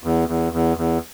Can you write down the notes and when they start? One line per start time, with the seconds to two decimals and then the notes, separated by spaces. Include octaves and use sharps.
0.04 E2
0.29 E2
0.53 E2
0.77 E2